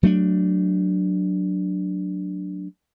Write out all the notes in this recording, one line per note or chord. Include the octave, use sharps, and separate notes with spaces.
F#3 A3 A#3 D4